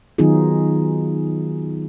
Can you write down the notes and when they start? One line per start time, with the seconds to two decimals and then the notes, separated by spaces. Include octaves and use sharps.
0.18 D#3 F#3 B3 D#4 F4 G#4